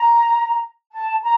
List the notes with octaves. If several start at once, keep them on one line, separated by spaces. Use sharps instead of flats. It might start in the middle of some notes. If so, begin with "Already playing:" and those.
Already playing: A#5
A5
A#5